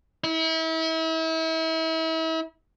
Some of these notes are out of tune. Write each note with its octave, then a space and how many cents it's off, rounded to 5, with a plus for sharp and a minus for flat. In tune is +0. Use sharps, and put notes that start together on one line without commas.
E4 -35